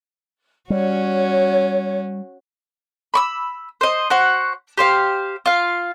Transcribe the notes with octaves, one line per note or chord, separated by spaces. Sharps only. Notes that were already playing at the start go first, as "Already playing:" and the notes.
G3 C#4 F#4 C#5
B5 C#6 E6
C5 D#5
F#4 C5 F#5
G4 C5 F5
F4 F5